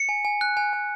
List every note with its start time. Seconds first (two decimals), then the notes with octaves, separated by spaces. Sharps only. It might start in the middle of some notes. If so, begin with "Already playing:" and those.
Already playing: C#7
0.09 G#5
0.25 G#5
0.41 F#6
0.57 G#5
0.73 G#5